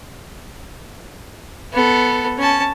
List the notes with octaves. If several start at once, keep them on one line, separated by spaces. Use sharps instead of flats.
B3 A4
C#4 A5